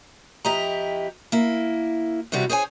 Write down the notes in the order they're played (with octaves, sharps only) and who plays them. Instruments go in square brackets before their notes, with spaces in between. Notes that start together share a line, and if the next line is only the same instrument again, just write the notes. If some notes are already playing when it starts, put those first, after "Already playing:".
[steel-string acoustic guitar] F2 E4 G4 D#5 A#5
A#3 E4
C3 E3 G3 F#4
G#4 C5 C#5 G#5